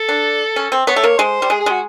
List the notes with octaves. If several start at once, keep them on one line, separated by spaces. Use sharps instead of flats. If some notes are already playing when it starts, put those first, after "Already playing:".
Already playing: A4
D4
C#4
C4
B3 C#5
A3
A#3
G#3 C5
G3
G#3 G#4
G#4
G#3 F#4